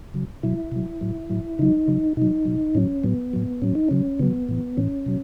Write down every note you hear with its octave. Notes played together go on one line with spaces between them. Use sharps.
C#3 F#3
B2 F#3 E4
B2 F#3
A2 F#3
A2 F#3
C#3 F#3 D#4
C#3 F#3
B2 F#3 D#4
B2 F#3
A2 F#3 C#4
A2 F#3 B3
A2 F#3
A2 F#3 C#4
D#4
C#3 F#3 C#4
C#3 F#3 B3
A2 E3
A2 E3 C#4
B2 F#3